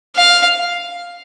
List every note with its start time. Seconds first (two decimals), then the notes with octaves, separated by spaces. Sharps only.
0.16 F5